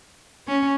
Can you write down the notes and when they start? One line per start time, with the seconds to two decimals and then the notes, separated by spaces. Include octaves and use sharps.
0.48 C#4